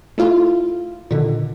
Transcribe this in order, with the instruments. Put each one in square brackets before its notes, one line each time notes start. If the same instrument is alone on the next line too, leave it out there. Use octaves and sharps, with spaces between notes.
[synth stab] A3 E4 F4
[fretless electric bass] A#2 D3 D#3